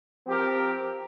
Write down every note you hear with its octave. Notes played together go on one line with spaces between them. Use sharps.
F3 C4 G4 A#4